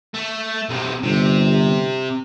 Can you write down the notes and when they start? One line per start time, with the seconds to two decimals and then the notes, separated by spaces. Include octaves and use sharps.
0.14 A3
0.69 B1 C3
1.03 G1 C3